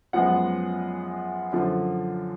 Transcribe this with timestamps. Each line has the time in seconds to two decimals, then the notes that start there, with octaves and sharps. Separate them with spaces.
0.13 F#2 F3 G#3 B3 F#5
1.52 F#2 D3 F3